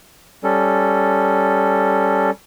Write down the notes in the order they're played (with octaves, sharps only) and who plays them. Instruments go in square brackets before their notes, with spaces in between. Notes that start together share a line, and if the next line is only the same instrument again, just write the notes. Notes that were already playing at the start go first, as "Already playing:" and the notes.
[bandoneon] G3 C#4 A4